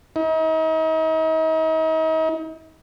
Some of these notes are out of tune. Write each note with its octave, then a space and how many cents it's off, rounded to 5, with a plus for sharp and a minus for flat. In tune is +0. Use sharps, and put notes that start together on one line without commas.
D#4 +40